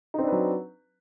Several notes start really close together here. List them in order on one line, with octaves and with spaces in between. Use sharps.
D#4 C4 D4 B4 F#3